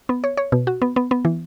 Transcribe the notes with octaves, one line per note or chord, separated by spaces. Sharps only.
B3
C#5
C#5
B2
F#4
B3
B3
B3
E3